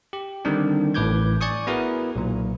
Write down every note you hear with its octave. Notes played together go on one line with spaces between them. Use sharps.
G4
D3 D#3 G3 C4 D4
A1 A2 B4 D6 G6 G#6
D5 G#5 C#6 D#6
B3 E4 F#4 G#4 A#4 B4
B1 A#2